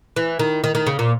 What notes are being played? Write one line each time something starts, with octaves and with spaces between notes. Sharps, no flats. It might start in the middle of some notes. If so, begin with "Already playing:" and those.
E3
D#3
D#3
D#3
C#3
A#2